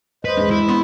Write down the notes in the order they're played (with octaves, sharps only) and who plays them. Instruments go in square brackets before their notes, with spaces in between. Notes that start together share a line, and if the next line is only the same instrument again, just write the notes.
[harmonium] E2 C5 D#5 [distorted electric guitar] B4
[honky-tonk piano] G#2
[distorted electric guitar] E4
[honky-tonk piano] B3 C6